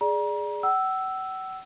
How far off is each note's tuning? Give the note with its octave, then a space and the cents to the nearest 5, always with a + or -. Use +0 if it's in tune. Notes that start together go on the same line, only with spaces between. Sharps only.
G#4 +0 D5 +0 A#5 +35
F#5 +40 E6 +0